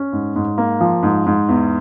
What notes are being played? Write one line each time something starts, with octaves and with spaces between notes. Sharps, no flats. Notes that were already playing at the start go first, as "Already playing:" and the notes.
Already playing: C#4
G#2
G#2
A#3
F3
G#2
G#2
E2